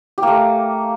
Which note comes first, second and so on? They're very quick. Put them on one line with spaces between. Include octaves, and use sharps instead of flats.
G4 A#3 A3